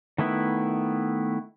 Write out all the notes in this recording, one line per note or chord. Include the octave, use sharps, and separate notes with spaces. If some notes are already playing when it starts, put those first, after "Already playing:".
D#3 A3 B3 E4